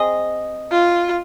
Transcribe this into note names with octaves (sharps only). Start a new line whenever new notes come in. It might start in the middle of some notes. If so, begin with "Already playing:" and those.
Already playing: C4 G#4 D#5
F4